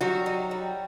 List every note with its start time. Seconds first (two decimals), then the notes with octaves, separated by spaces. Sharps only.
0.01 F#3 G3 F#4
0.26 D#4
0.51 G3